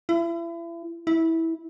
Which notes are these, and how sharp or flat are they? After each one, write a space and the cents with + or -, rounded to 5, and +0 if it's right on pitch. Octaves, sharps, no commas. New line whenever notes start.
E4 +35
E4 -15